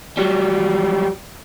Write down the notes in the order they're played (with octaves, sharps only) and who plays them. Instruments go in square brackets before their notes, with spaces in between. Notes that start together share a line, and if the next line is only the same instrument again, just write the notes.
[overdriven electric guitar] F#3 G3